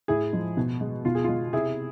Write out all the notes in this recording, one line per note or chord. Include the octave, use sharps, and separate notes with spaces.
A2 E4 G#4
F3 G#3
B2
G#3
B2 F4
G#4
F4
G#3
C3 E4 G#4